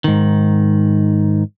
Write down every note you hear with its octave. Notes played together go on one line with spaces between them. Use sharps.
G#2 D#3